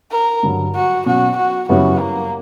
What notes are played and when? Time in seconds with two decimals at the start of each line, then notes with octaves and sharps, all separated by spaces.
0.12 A#4
0.43 G2 D3 F#3
0.76 F#4
1.06 B2 F#3 C#4 F#4
1.37 F#4
1.69 F#2 C#3 G3 B3 E4 F#4
2.00 A#3